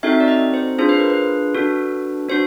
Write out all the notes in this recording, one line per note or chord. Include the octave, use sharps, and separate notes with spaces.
C4 D#4 F#4 A4 E5
D5
D#5
C5
D4 F4 G#4 C5
B4
A#4
B4
D4 F#4 A4
D4 F#4 C5